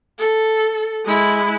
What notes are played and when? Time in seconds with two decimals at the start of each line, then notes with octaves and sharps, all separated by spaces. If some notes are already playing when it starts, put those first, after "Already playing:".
0.19 A4
1.05 G#3 E4